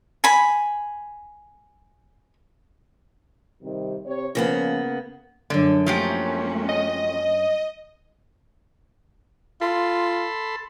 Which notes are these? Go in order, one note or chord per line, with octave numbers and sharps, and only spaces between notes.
G#5 B5
C3 D#3 G3
C3 C#5
C#3 F3 A#3 B3 C#4
F#2 D3 D4
F3 F#3 A3 A#3 C#4 G4
D#5
F4 A4 B5 C6